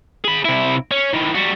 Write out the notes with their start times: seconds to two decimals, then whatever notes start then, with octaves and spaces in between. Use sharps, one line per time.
0.25 G#4 B5
0.45 C3 E4
0.92 C#4
1.14 D#3 E3
1.35 G3 F#4